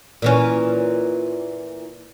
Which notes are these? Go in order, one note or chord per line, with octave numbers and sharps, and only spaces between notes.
A#2 E3 C#4